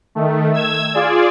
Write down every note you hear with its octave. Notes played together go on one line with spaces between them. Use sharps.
D#3 A3
E6 G#6
F4 G#4 D5